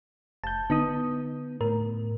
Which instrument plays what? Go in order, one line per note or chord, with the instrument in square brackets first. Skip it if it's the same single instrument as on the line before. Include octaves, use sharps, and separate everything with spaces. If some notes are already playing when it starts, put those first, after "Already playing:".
[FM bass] F1 [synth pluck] A5 G6
[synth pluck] D3 D#4 D#6 [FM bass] B3
[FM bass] A2 [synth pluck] A#4